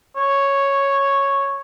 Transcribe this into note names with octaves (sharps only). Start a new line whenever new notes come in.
C#5